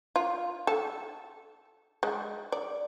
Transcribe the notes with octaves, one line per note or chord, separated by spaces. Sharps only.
F4
A4
G#3
D5